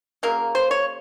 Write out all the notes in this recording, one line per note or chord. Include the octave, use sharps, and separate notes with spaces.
C#3 F#3 A#3 A#4
C5
C#5